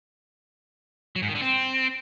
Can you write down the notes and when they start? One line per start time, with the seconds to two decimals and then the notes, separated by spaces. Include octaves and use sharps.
1.16 F#3
1.22 G#2
1.29 D#3
1.35 D3
1.41 C4